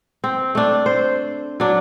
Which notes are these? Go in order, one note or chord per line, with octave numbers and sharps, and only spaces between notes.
C4
A3 D4
C5
F#3 D4